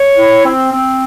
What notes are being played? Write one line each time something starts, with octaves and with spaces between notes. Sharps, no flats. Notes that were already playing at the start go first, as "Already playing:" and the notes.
Already playing: C#5
E4
C4
C4